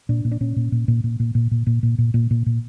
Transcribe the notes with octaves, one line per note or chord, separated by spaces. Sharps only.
A#2 D4
A#2
D4
A#2 C#4
A#2
A#2
A#2
A#2
A#2
A#2
A#2
A#2
A#2
A#2
A#2
A#2
A#2